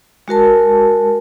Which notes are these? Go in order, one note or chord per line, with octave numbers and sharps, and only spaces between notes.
G#3 F#4 A#4 A5